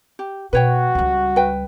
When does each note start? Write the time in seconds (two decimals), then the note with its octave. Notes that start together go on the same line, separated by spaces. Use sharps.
0.19 G4
0.53 B2 F#4 B4 C#5 G5
0.95 C#2 G3
1.36 B4 G5